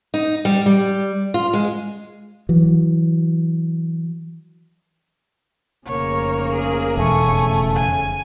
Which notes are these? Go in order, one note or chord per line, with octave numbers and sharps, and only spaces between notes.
D#4
G3
G3
F4
G#3
E3 F#3
F1 C#3 A#3 C#5
G#4
E1 A3 G#5 C#6
G#5